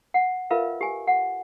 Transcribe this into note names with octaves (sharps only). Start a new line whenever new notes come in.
F#5
F4 A#4 B4 E5 F5
G4 G#5
F#5